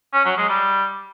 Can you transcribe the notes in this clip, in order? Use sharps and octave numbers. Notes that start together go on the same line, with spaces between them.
C#4
F#3
G#3
G3